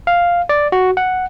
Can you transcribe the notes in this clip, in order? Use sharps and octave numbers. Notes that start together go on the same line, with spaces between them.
F5
D5
F#4
F#5